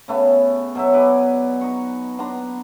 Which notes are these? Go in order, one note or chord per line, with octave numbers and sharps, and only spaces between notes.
C#3 A3 B3
B2 F#3 E5
B4 D5 D#5 G#5
D#4 D#5 C#6
B3 D4 A#5 C6